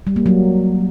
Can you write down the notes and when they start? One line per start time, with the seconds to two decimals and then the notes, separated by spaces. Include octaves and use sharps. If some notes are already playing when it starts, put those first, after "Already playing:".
0.07 G3
0.16 A#3
0.26 F#3